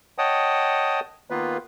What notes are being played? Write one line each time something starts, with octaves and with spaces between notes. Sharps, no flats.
C#5 D#5 F#5 G5 A5 D#6
D#3 A#3 B3 F4 B4